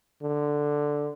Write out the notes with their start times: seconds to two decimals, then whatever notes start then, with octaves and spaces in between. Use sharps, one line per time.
0.23 D3